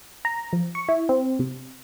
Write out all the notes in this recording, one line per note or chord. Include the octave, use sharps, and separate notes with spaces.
A#5
F3
C#6
E4
C4
C3